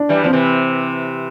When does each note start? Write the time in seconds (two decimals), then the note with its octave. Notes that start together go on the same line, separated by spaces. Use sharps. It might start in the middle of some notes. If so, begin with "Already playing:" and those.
Already playing: D4
0.09 E3 G3
0.24 F3 C4
0.33 C3 E3